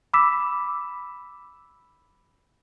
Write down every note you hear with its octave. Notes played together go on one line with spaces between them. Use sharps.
B5 D6 E6 B6 E7